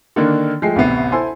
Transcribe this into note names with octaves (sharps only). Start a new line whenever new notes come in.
D3 D#3 A#3 D4
F3 G#3 A3 G5 C7
A1 D2 C3 B3 C7
E4 A4 C5 G#5 C6